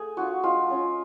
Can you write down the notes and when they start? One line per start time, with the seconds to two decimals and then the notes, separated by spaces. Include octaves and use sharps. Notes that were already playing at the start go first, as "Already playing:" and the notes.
Already playing: A3 G#4
0.17 D4 F4 F#4
0.43 G#3 F4
0.70 C#4 F4